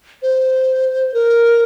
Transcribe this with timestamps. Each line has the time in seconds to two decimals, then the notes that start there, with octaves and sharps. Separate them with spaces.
0.22 C5
1.14 A#4